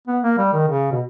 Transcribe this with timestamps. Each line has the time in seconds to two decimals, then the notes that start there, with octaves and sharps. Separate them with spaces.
0.07 B3
0.23 A#3
0.38 G3
0.53 D#3
0.68 C#3
0.92 B2